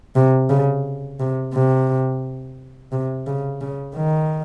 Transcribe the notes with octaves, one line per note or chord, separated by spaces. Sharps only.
C3
C#3
C3
C3
C3
C#3
C#3
D#3